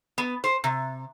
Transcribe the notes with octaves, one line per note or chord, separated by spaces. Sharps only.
B3
C5
C3